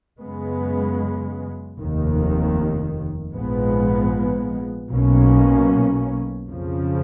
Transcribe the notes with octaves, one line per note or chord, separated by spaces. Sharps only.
F#2 C#3 G#3 B3
F1 D#2 D#3
A#1 G#2 F3 G#3 B3
B1 B2 A#3 C#4
F2 C#3 F3